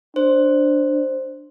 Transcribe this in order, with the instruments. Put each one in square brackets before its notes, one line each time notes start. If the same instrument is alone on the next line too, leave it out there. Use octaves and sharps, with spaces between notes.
[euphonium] D4 [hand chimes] C5